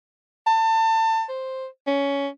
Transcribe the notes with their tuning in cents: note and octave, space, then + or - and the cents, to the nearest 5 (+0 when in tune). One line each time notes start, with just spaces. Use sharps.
A5 +30
C5 +5
C#4 +15